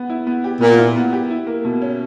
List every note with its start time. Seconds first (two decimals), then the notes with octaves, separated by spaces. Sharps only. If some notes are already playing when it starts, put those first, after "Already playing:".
Already playing: B3
0.10 E4
0.27 B3
0.44 G4
0.61 A#2 B3
0.78 E4
0.96 B3
1.13 G4
1.30 E4
1.47 A#3
1.65 B2
1.82 C#4